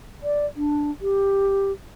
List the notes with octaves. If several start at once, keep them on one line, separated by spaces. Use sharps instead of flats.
D5
D4
G4